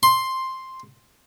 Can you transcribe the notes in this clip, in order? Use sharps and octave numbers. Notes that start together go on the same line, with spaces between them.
C6